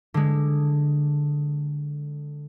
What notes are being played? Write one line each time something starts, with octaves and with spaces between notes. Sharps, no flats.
D3 G#3